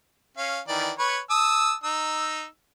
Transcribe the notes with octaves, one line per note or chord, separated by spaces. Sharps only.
C#4 F5
D#3 E3 D5
B4 C#5
A5 D#6 E6
D#4 E6